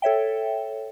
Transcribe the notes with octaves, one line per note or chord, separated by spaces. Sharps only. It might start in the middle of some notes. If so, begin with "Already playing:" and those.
A4 C#5 E5 G5